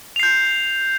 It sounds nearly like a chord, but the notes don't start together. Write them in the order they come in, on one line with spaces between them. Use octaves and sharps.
F7 C7 G6